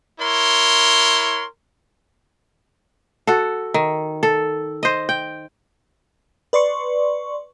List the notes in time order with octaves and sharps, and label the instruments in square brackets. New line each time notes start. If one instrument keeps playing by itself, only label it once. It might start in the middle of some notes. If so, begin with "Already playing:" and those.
[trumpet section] E4 A#4 C#5 C6
[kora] F#4 A4
D#3
A4
C5 D#5
G5
[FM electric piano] B4 D5 C6 C#6